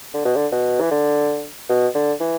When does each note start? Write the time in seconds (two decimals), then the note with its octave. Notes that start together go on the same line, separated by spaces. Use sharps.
0.14 D3
0.25 B2
0.36 D3
0.52 B2
0.80 E3
0.91 D3
1.69 B2
1.94 D3
2.20 E3